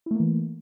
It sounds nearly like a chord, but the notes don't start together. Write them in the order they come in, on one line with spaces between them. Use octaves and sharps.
E4 A3 A#3 E3